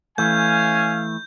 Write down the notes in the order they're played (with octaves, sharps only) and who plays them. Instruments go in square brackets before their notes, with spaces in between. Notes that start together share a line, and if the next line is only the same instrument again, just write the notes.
[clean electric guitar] E3 A3 [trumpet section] C#4 F5 G#5 [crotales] G6